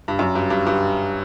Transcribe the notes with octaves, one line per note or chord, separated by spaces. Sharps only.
G2
F#2
G2
G2
G2